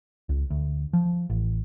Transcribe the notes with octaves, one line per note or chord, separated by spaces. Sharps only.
C#2
D2
F3
A1